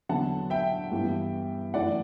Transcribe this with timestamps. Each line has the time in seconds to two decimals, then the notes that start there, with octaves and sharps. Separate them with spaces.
0.09 E2 D3 F#3 F#5 A5
0.50 E5 G5
0.91 G2 E3 B3
1.74 F#2 E3 A3 D5 F#5